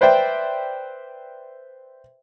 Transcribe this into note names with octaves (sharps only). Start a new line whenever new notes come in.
B4 C5 D5 E5 G5